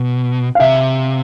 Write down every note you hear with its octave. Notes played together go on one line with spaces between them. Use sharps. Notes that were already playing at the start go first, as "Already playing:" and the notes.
Already playing: B2
F5
C3 E5